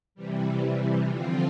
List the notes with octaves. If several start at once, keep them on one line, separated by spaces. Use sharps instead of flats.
C3 E3 G3
D3 F3 C4 F4